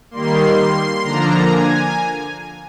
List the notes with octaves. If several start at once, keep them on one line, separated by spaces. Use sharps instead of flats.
D#3 G3 A#3 C6
D3 F3 A#3 D4 A#5
G#5